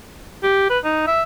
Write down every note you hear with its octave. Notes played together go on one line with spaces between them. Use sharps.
G4
B4
D#4
E5